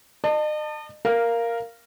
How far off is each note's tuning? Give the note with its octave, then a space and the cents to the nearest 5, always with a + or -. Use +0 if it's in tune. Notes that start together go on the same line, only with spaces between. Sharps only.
D#5 -40 A5 +25
A#4 +0 F5 -10 A#5 +0